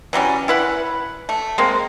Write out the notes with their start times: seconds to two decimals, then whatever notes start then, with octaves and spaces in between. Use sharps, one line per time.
0.13 E3 F#3 G3 C#4
0.48 E4 B4 F#5
1.29 A3
1.58 G#3 A#3 C4